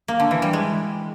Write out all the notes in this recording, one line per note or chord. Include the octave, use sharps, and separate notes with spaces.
A#3
D3
E3
G3
G#3